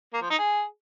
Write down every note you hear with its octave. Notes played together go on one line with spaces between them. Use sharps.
A#3
F3
D#4
G#4